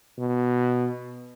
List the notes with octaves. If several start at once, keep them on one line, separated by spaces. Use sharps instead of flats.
B2